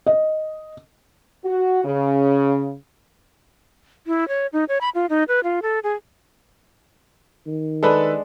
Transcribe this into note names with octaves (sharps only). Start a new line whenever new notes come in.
D#5
F#4
C#3
E4
C#5
D#4
C#5
B5
F4
D#4
B4
F4
A4
G#4
D#3
G#3 D4 A4 B4 B5